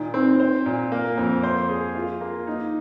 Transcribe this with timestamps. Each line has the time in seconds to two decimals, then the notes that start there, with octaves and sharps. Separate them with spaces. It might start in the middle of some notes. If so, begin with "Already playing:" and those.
Already playing: A#2 D#3
0.14 C4
0.40 C5
0.66 A#2
0.92 A#3
1.18 F2
1.43 C5
1.69 G#4
1.95 F4
2.21 A#3
2.47 D#4